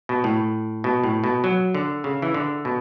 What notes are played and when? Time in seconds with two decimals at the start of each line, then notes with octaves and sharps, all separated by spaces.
0.09 B2
0.24 A2
0.84 B2
1.04 A2
1.24 B2
1.44 F#3
1.75 D3
2.04 C#3
2.22 E3
2.34 D3
2.65 B2